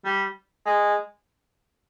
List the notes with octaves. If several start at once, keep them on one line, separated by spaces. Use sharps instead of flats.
G3
G#3